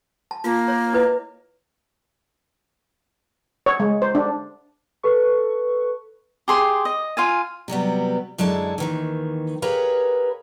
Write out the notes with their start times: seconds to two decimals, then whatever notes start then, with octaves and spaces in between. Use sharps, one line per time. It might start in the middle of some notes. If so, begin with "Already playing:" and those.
0.31 A5
0.44 A#3 F4
0.68 C#5
0.93 E4 B4 D#5
3.66 C#5
3.80 G#3
4.02 C5
4.15 D4
5.03 A4 B4 C#6
6.48 G4 G#4 C6
6.85 D#5
7.17 F4 F5 G#5
7.68 C3 F#3 G3 B3
8.38 F#2 D3 G#3 E4 A5
8.78 D#2 D#3 E3
9.62 G4 G#4 A#4 B4 C#5 F5